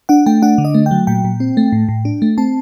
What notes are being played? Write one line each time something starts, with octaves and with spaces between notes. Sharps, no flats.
D4 F#5
A3 G5
D4 F#5
D3
D#5
A3
G5
F#3
A#2 G5
A#2
C4
A3
A2
A2
D4
A3
C4 A5